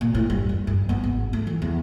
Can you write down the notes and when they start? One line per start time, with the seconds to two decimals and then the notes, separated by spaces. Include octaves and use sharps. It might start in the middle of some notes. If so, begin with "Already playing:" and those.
0.01 A#2
0.15 A2
0.30 G2
0.49 F#2
0.67 G2
0.89 B3
1.04 G#1
1.33 A3
1.47 E3
1.62 E2